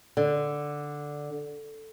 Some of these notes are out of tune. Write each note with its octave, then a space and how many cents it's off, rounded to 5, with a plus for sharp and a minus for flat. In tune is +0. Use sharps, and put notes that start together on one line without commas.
D3 +0